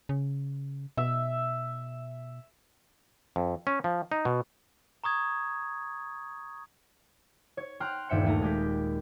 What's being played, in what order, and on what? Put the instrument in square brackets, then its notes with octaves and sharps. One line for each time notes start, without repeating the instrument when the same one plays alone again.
[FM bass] C#3
[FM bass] B2 [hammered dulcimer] E5
[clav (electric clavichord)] F2
C#4
F3
D#4
B2
[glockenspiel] A#5 C#6 D#6 G#6
[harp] C#5
G5 A#5 C6 F6 F#6
D#1 G2 E5 G5 C#7
D#2 A3 A#5
G#3 G4 B6